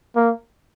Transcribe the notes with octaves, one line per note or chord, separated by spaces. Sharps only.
A#3